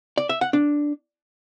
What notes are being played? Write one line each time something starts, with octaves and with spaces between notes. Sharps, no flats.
D5
E5
F#5
D4